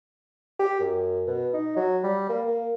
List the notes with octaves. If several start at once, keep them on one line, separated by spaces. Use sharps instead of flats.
G4
F#2
B2
D#4
F#3
G3
A#3
A#3